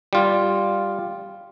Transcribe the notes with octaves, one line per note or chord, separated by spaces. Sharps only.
G3 F4